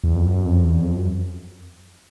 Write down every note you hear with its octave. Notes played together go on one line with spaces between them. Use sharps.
E2
F2
F#2
F2
E2
F2
F#2